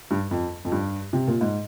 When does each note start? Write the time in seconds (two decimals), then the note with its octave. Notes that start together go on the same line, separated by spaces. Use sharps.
0.11 G2
0.31 F2
0.65 F2
0.72 G2
1.13 C3
1.27 A#2
1.41 G#2